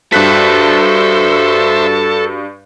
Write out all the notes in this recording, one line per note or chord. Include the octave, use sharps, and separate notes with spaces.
G2 F#4 A4 C5 E5 F5 F#6 B6